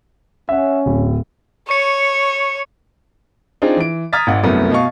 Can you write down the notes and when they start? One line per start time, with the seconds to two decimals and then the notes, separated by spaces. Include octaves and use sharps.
0.49 C#4 E5 F#5
0.86 D1
1.69 C#5 C#6 C#7
3.62 C4 D4 D#4 F4 G#4
3.77 E3 D7
4.13 A#5 D#6 F6 G#6 A6 B6
4.27 G#1 G#2 F#5
4.43 C2 F#2 A3 B3
4.71 B2 D#5 F5 C#6